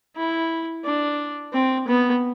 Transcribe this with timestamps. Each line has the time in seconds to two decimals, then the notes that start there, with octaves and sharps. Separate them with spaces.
0.17 E4
0.85 D4
1.53 C4
1.87 B3